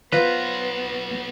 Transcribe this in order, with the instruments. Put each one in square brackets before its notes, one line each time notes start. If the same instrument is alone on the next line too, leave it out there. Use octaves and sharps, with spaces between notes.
[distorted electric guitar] B1 A#5 [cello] B3 [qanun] F4 C5 [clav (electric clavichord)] B4